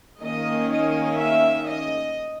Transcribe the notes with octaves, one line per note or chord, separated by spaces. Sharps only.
D#3 A#3 C#4 D#5
D#5
E5
D#5